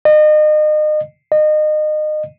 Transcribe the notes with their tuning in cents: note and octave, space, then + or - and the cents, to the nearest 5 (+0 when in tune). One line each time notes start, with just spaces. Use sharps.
D#5 -35
D#5 -30